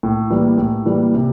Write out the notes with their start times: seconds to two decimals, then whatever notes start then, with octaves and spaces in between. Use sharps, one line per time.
0.03 A2
0.30 E3 G3 A#3
0.58 A2
0.86 E3 G3 A#3
1.14 C3